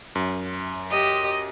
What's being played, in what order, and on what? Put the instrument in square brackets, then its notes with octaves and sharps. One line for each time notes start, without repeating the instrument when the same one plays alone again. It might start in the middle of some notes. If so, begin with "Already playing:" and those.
[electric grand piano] F#2
[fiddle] G4 [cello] D#5